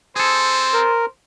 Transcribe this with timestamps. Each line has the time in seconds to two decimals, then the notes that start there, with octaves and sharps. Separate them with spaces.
0.16 C4 G#4 A4 C5
0.73 A#4